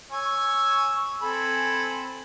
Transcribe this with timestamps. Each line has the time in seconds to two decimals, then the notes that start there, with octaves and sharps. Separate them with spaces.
0.12 C#5 G#5 E6
1.22 C4 A4 G#5 B5